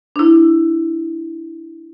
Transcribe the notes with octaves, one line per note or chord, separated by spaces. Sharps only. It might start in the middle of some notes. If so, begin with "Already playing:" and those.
D4 E4